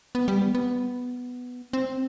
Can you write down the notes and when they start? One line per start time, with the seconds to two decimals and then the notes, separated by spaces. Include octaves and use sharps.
0.15 B3
0.28 G3
0.42 B3
0.55 B3
1.73 C4